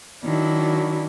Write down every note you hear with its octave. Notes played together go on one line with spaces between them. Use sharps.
D#3 F#3 D4 E4